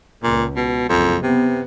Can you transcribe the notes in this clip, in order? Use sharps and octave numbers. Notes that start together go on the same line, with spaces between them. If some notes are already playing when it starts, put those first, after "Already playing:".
C#2 A#2
B2
F#1 C2 F2
C3 B3